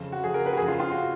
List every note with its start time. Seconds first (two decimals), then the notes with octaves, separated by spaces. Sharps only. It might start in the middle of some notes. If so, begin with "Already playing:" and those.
Already playing: F2 C#3
0.12 F#4
0.23 F2 G#4
0.26 C#3
0.34 A#4
0.46 B4
0.53 F#4
0.57 F2 C#3 G#4
0.68 F4
0.80 F4
0.91 C#3 F#4